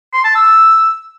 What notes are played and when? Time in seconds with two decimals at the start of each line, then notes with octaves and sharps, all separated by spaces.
0.14 C6
0.24 A5
0.35 E6